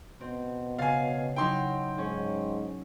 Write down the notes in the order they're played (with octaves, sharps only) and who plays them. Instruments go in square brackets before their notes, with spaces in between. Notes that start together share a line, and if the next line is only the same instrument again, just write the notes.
[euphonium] B2 [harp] C4
[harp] C#3 A6 C7 [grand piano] F5 G#5
[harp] F#3 D#4 E4 [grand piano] G5 C6
[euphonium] G#2 [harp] C#4